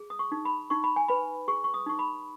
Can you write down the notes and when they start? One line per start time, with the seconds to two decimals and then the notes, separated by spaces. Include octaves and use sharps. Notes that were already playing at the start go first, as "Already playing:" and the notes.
Already playing: G#4
0.10 D#6
0.19 C#6
0.32 D#4
0.45 B5
0.70 D#4 C#6
0.84 B5
0.96 G#5
1.08 B4 B5
1.48 G#4 C#6
1.64 C#6
1.74 D#6
1.86 D#4 C#6
1.99 B5